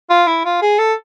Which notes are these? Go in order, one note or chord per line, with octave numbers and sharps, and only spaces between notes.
F4
E4
F4
G#4
A4